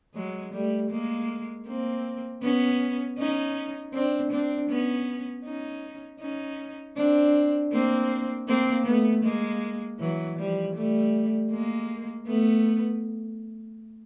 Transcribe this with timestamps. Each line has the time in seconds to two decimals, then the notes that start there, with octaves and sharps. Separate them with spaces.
0.15 F#3 G#3
0.53 G3 A3
0.90 G#3 A#3
1.66 A#3 C4
2.42 B3 C#4
3.18 C#4 D#4
3.94 C4 D4
4.31 C4 D4
4.69 B3 C#4
5.45 C#4 D#4
6.20 C#4 D#4
6.97 C4 D4
7.72 A#3 C4
8.48 A#3 C4
8.86 A3 B3
9.23 G#3 A#3
10.00 E3 F#3
10.38 F3 G3
10.75 G3 A3
11.51 G#3 A#3
12.27 A3 B3